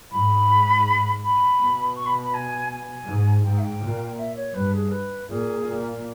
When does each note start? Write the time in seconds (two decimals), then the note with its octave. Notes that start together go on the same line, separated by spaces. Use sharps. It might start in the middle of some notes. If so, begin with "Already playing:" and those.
0.12 G#2 B5
1.23 B5
1.59 B2
1.96 C#6
2.06 B5
2.24 B5
2.34 G#5
2.70 G#5
3.07 G#2
3.44 G#2 G5
3.58 E5
3.62 G5
3.81 A#2
4.18 E5
4.36 C#5
4.54 G2 B4
4.73 G#4
4.91 B4
5.29 A#2 G#4
5.66 A#2